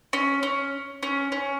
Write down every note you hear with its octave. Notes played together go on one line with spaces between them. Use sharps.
C#4
C#4
C#4
C#4